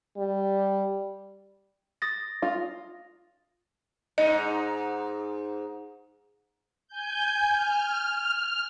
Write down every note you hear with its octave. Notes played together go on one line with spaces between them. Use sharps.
G3
D#6 A6 A#6
F4
G#2 D#4 D#5
G#5 G6
F6